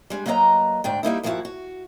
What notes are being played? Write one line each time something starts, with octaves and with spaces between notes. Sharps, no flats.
G3 G#3 D4
F#3 A#3 B4 D#5 E5 A#5
D2 G#2 D4 G5
G3 A#3 D#4 E4
G2 F3 A#3 E4 F#4
F#4